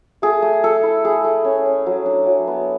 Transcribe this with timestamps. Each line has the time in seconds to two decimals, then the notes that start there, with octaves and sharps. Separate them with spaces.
0.22 A3 G#4
0.42 A3
0.63 A3 A4
0.83 E4
1.05 A3 G#4
1.24 A3
1.44 C#4
1.66 C#4
1.86 F#3
2.06 D4
2.26 F#3
2.47 B3